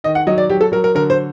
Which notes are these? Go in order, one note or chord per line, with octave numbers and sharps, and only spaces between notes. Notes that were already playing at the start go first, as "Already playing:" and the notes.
D#3 D#5
F#5
F#3 D#5
D5
F#3 G4
A4
F#3 A#4
A#4
D3 A#4
C5